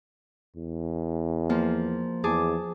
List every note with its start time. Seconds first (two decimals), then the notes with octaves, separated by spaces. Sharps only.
0.56 E2
1.50 F3 A#3
2.24 E2 G#4 A5 D6